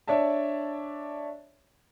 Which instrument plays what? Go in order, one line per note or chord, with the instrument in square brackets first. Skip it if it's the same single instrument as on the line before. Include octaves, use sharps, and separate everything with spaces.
[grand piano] D4 C#5 D5 E5 A5